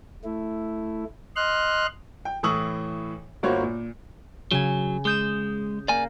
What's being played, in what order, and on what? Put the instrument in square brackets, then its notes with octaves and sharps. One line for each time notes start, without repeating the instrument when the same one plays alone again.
[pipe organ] A3 E4
D#5 C6 F6 F#6
[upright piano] G5
A2 E3 C#6 D#6 E6 F#7
G1 A#3 F4 F#4 C5 C#5
A#2
[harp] C#3 G#5 [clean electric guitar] F#3
[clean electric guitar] G#3 [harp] D#6 G6 E7
[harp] A#3 [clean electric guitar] D5 G#5